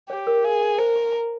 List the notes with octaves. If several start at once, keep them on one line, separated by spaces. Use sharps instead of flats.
G4 C#5
A#4
G#4 F5
G#5
A#4 C5
G4
A#5